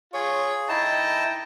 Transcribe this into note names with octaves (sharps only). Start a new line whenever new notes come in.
F4 G#4 C#5
D#4 E4 G5 A5 A#5